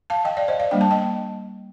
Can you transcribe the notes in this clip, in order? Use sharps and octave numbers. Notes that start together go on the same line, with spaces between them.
F5 A5
D#5 G5
D5 F5
C5 D#5
D5 F5
G3 A#3 D4 G5
A5
D#5 G5